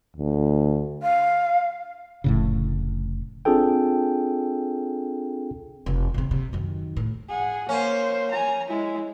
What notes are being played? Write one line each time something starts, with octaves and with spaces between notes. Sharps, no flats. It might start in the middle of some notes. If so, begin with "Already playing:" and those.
D2
F5
F1 A2 C#3
C4 D4 F4 G#4 A4 G5
F1
E2 C3
C3
F#2 D#3
A2
G#4 F#5
A#3 C#4 C5
G#5 A#5
G#3 E4